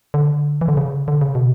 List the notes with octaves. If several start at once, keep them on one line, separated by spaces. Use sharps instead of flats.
D3
E3
D3
C#3
D3
C#3
B2